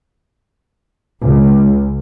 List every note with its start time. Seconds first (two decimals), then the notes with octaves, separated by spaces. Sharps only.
1.22 C#2